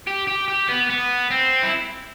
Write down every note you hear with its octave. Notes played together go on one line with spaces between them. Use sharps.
G4
G4
G4
B3
B3
C4
E4